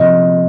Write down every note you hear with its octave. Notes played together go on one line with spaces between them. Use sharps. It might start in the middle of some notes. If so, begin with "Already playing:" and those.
Already playing: C3 F3 D#5